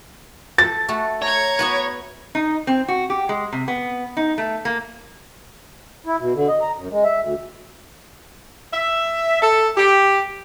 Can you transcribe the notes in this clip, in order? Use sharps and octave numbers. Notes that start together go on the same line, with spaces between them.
A4 A6
A3 F#4 A4
C#5 A#5 G#6
B3 F#4 B4
D#4
C4
F#4
G4
G#3
C3
B3
D#4
A3
A#3
E4
B2
D3
D#5
A#5
F#2
G#3
E5
D2
E5
A4
G4